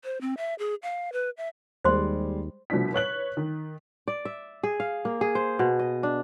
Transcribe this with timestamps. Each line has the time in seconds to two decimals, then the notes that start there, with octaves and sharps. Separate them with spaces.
0.04 C5
0.21 C4
0.37 E5
0.59 G#4
0.83 F5
1.13 B4
1.37 E5
1.84 D#2 G3 G#3 C5 C6
2.70 C2 B2 F3 D4 B6
2.93 B4 C#5 F#6 F#7
3.37 D#3
4.08 D5
4.25 E5
4.63 G#4
4.80 F5
5.05 A#3
5.21 G#4
5.35 C5
5.59 B2
5.79 D#5
6.03 D4